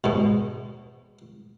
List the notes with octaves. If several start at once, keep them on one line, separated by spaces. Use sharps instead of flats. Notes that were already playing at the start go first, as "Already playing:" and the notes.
G#2 B2